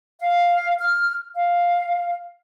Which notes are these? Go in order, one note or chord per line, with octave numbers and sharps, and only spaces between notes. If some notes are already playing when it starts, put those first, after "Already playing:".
F5
F6
F5